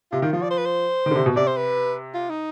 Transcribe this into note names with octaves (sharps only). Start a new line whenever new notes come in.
C3 F4
D#3 F4
F3 F4
D5
C5
B4
C5
D#3
D3
C3
B2
C3 D5
C5
B4
F4
D#4